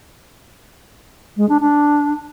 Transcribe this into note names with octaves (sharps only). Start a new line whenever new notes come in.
G#3
D4
D4